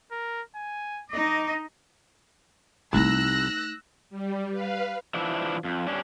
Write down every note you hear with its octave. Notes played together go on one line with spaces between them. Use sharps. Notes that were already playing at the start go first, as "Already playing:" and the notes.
A#4
G#5
D#4 D#5 D6
C2 A3 D#4 E6 F#6 A#6
G3
B4 F5
E3 F3 D4 E4
F2
G3 C#4 D4